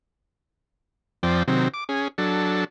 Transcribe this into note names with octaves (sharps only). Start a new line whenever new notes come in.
F2 F3 C4 D5 G5
C3 D#3 F#3 C4
D6
C#4 G#4
F#3 D4 A4